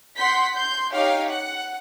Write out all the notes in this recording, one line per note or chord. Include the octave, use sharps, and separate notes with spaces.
F#5 C6 G6 B6
C6 G6
D#4 G4 C#5 F5
F#5